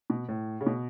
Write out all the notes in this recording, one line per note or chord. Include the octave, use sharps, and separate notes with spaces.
B2
A2
C#3
B2